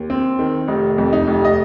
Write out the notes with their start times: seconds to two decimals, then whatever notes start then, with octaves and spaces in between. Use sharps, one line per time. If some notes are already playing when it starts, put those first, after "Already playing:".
Already playing: D#2
0.10 C4
0.39 D#3
0.68 F1 D#4
0.98 F2
1.13 D#4
1.27 F1
1.45 D#5